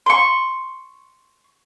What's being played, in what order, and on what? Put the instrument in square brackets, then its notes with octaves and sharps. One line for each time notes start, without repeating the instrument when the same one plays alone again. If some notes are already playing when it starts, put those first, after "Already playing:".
[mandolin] C6 C#6